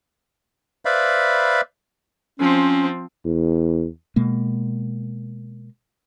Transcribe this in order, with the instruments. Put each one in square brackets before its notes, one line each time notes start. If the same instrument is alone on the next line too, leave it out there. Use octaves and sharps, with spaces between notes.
[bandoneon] B4 C5 D5 E5 F5 B5
[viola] F3 C4 [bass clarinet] C#4
[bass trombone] E2
[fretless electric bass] B2 G#3 A#3